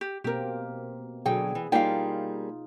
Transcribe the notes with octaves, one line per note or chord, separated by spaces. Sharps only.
G4
B2 A#3 C4 G4 A#4
B2 D3 F#3 G#4 G5
E3
G3 A#3 D#4 F4 G#4 F5 G5